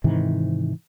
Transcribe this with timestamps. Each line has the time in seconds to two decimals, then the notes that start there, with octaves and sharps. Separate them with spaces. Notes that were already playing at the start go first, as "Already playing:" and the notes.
0.04 G#2 C3 D#3 E3